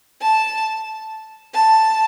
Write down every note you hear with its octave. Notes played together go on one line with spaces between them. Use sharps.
A5
A5